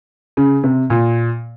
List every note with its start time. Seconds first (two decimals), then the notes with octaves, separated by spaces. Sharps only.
0.37 C#3
0.63 C3
0.90 A#2